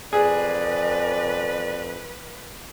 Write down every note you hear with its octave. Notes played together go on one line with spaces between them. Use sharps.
F2 G#4 B4 D5